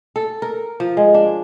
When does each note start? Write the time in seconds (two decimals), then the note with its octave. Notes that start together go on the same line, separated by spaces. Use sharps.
0.16 A4
0.42 A#4
0.80 F3
0.97 G#3
1.14 D4